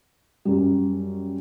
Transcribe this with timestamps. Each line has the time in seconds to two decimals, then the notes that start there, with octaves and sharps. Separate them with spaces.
0.45 F#2 G3